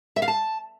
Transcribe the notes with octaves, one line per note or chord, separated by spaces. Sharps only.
E5
F5
A5